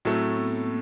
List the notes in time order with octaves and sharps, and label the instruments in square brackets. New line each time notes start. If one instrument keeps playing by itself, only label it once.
[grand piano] A2 F#3 A3 [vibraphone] C4
[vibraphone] B3
A#3